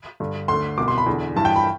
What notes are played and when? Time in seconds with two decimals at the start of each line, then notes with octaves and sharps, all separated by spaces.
0.20 G2 D3
0.48 D2 D3 C6
0.78 C2 B2 D6
0.88 C6
0.98 B5
1.06 E2 D3
1.36 G2 E3 A5
1.45 G5
1.56 B5